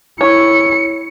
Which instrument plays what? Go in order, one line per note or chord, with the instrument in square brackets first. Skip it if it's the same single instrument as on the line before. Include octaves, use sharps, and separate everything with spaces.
[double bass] E4 [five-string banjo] C#5 [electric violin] C#7